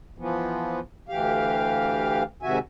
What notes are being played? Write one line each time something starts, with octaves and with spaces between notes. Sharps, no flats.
E3 F3 B3
D2 E3 G4 F5
G#2 C3 D#3 F#4 E5 G#5